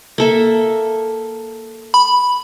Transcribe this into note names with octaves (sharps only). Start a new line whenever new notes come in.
A#3 A4 E5
B5